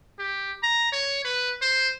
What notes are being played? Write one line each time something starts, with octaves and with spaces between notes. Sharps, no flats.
G4
A#5
C#5
B4
C5